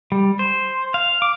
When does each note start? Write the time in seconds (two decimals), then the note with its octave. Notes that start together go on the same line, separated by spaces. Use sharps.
0.12 G3
0.39 C5
0.94 F5
1.22 D6